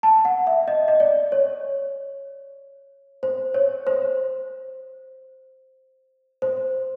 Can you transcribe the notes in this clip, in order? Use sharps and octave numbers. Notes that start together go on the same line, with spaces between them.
A5
F#5
E5
D#5
D#5
D5
C#5
C5
C#5
C5
C5